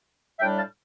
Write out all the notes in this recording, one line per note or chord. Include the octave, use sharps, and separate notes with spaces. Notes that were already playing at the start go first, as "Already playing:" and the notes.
A2 G3 D4 E5 G5
F5 A5